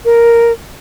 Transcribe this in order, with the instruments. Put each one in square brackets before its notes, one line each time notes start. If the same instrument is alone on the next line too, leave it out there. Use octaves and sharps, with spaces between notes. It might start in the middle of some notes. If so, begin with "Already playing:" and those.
[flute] A#4